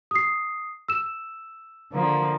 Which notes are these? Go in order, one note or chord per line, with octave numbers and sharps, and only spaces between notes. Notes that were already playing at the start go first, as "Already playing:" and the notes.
D#6 C7
E6 E7
D3 F3 A#3